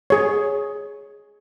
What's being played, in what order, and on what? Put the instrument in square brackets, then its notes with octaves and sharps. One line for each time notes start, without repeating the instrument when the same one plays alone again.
[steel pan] G#4 C#5